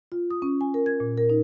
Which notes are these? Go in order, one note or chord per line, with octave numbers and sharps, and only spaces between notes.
F4
D#6
C#4
G#5
A#4
G#6
A#2
A#4
D#4